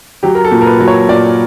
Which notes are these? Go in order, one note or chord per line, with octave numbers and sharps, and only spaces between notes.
F#3 G4
A#4
A4
A#2
A#4
B4
F#3
C#5
A#2 D5